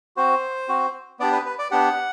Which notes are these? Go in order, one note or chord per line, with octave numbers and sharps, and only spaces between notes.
C4 F#4 C5
C4 F#4
B3 D4 G4 D5
B4
B4
D5
B3 D4 G4 F#5